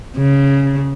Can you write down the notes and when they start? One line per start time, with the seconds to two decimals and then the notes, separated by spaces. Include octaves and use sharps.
0.17 C#3